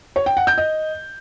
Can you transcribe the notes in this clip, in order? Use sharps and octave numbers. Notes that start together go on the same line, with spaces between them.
C#5
G5
F#5
G6
D#5